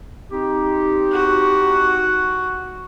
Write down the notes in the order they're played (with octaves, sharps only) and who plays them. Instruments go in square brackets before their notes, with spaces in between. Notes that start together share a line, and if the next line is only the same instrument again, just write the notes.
[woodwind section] C4 D#4 G4
[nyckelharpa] F#4